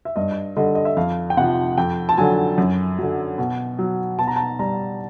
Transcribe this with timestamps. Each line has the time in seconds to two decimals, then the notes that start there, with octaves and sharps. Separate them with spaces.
0.05 E5
0.16 G2 D#5
0.56 D3 G3 D#5
0.75 D#5
0.85 E5
0.97 F2 F5
1.30 G5
1.37 C3 F3 F#5
1.78 F2 G5
2.09 A5
2.18 D3 F#3 G#5
2.58 F#2
2.99 D3 F#3
3.38 B2
3.79 F#3
4.19 B2 A5
4.27 A#5
4.36 A5
4.59 G3 A#5